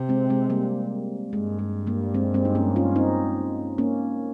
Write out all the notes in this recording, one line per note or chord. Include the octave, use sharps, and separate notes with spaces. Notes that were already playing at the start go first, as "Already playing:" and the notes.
Already playing: C3
G#3 C4
G#3 C4
G3 A#3
G2 G#3
G#3
G3 A#3
G#3 C4
G#3 C4
D#4
A#3 C#4
C#4 F4
C4 D#4
A#3 C#4